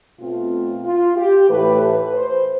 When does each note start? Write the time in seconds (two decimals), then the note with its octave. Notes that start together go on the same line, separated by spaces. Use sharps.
0.19 B2 A3 C4 F4
0.84 F4
1.17 G4
1.49 A2 E3 A3 B4
1.81 B4
2.14 C5